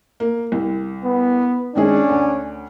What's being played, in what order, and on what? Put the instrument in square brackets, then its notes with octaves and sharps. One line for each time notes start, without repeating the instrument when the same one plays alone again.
[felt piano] A#3
C2
[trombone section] B3
[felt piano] D#3 G#3 G#4 [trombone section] C#4 D4
[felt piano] D2